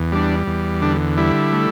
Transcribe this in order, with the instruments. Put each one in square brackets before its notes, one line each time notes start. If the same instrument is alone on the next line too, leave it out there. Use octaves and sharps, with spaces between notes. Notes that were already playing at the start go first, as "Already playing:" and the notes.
Already playing: [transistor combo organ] E2
G3 D4
E2
D3 D4
G3 E4
A3